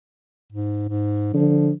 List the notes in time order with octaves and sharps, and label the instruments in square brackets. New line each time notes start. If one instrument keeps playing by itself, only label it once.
[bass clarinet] G#2
G#2
[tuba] D3 [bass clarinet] F3